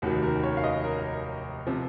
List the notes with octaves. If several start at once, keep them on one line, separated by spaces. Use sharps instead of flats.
F1 D#2 D#3 F#3
A#4
C#5
F5
D#5
A#4
C3 F3